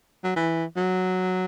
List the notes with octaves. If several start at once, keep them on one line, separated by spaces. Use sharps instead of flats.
F#3
E3
F#3